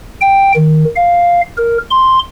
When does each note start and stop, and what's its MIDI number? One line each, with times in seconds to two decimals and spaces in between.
0.21 0.52 79
0.56 0.85 51
0.96 1.41 77
1.57 1.78 70
1.90 2.19 84